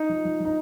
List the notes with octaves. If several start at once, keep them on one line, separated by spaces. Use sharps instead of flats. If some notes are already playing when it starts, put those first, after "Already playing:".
Already playing: D#4
F3
F3
F3 D#4